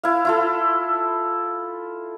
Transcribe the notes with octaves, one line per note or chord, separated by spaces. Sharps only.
E4 F5
E4 F4 A4